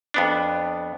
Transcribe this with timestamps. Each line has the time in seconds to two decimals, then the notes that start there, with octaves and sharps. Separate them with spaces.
0.14 F2 B3 D4